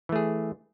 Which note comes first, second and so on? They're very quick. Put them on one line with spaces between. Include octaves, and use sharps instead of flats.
E3 A3 G#4